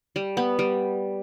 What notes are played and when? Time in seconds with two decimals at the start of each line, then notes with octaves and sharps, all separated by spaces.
0.16 G3
0.37 B3
0.59 G3